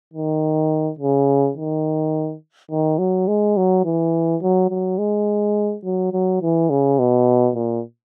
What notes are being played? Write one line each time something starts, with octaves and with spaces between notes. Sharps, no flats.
D#3
C#3
D#3
D#3
F#3
G#3
F#3
E3
F#3
F#3
G#3
F#3
F#3
E3
C#3
B2
A#2